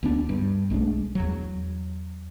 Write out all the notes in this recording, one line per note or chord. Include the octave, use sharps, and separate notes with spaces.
D2 B3 D4
G2
B1 G#3 A3 D4
E2 F#3